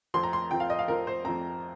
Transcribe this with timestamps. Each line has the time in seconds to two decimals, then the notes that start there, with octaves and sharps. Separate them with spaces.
0.14 F2 F3 C4 C6
0.23 A#5
0.33 C6
0.51 F2 F3 C4 G5
0.60 F5
0.70 D#5
0.79 F5
0.87 F2 F3 C4 A#4
1.07 C5
1.24 F2 F3 C4 A#5